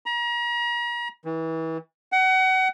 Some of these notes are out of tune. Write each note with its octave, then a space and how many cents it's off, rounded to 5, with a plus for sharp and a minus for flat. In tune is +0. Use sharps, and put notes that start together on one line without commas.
A#5 +40
E3 -30
F#5 +30